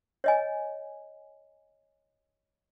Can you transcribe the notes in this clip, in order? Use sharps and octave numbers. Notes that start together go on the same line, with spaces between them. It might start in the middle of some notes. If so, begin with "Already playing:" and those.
C#5 D#5 G#5